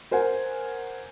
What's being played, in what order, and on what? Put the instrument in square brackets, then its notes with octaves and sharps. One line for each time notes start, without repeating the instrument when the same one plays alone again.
[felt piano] A#4 C5 F#5 G#5